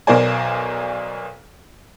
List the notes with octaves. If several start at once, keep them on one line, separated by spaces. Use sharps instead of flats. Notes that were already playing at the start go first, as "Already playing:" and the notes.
B1 B2 A#4 C5 D5 G#5